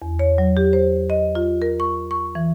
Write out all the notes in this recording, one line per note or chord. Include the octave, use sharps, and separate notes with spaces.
E2
C#5
F#3
G4
C5
D#5
F4
A#4
C#6
C#6
E3